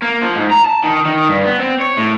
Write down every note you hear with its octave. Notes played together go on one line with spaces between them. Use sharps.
A#3
F3
G#2
A#5
A5
D#3
D#3
G2
B3
C4
C#5
A2